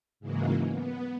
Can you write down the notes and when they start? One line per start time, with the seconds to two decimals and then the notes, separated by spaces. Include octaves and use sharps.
0.20 G#2 C#3 E3 F#3 G#3 A#3
0.70 B3